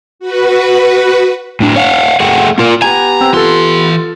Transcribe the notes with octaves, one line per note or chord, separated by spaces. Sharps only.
F#4 B4
A2 D4
C#5 F5 F#5
A3 G#4 F#5 G5
A#3 F4 A#4
B3 G4 G#5 A#5
C4 G5 E6
E3 F4 A4 C6